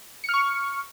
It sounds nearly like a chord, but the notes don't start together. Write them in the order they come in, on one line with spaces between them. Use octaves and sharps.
C#7 F6 C#6